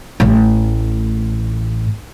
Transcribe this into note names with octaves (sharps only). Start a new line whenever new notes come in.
A1 A2